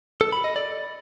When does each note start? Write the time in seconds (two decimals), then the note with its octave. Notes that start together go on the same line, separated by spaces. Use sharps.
0.21 A4
0.32 B5
0.44 D#5
0.56 D5